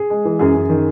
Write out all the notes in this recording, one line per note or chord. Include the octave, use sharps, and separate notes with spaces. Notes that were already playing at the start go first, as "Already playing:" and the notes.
Already playing: G#4
G#3
E3
F#2 G#4
F#2
D#3